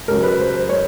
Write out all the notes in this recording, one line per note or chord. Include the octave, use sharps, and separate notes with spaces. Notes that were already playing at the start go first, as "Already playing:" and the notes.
C#2 C#3 F#3 A#4
B4
C5
C5
C#5